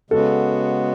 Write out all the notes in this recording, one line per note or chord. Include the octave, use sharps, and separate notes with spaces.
C#3 G#3 B3 F#4 A4